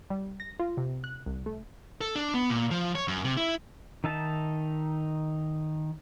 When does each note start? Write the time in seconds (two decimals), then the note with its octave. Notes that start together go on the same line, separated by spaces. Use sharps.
0.10 G3
0.40 A#6
0.59 F4
0.77 C3
1.04 F#6
1.26 C2
1.46 A3
2.01 A4
2.16 D4
2.34 B3
2.50 A#2
2.71 F3
2.95 C#5
3.08 F#2
3.25 C3
3.37 E4
4.04 D#3 D#4 E5 A5